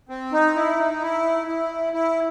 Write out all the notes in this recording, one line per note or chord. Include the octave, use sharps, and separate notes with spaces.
C4
D#4
E4
D#4
E4
E4
E4